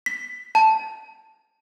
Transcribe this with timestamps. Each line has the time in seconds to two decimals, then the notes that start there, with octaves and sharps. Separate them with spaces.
0.06 B6
0.55 A5